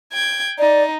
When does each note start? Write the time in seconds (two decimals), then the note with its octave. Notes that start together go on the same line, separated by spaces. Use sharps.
0.13 G5 G#6
0.59 D#4 D5